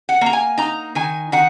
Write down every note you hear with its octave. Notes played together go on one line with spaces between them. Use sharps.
F#5
A#3 A#5
G#5
D#4 A#5
D#3 G#5
D#3 F#5